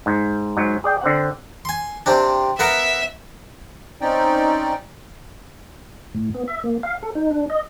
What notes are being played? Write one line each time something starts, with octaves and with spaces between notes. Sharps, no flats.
G#2
G#2 F#3
G#4 D5 G5
D3 C4 F#5
G#5 C6
C3 C4 D4
B3 A#4 E5 F#5
C4 C#4 D#4 D5 G5
A2
B3
E5
A#3
F5
A4
D#4
D4
D#5